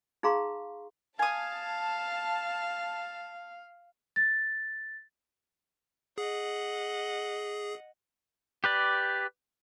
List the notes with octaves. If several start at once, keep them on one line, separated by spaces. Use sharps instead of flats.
D#4 G#4 F5 A#5 C6 C#6
F5 G#5 A5 D#6
A6
G#4 D#5 F#5
G4 B4 D5